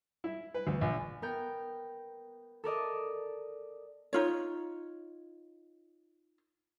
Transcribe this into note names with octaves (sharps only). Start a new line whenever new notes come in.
E4
B4
D2
A#1
B3 A#4 G5
A4 A#4 D5 D#5
D#4 F4 C#5